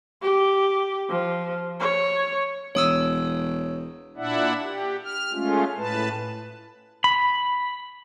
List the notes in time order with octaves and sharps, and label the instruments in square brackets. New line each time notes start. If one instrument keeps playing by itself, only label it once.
[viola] G4
F3
C#5
[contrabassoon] E1 [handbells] C#5 D#6 E6
[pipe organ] A#2 D4 E4 D5 E5 F#5
G4
F6
G#3 A3 C#4 F4
A2 B4 A5
[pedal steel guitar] B5